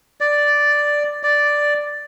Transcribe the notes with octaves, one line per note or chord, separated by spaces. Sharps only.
D5
D5